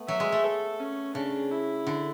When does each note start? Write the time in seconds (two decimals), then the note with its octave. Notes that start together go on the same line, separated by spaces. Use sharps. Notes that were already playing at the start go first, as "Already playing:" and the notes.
Already playing: A3 B3
0.08 F#3 E5
0.20 G#3
0.32 A3
0.44 A4
0.80 C#4
1.15 C#3 D4
1.52 E4
1.87 D3